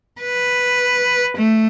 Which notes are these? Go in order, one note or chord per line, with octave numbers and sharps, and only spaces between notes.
B4
A3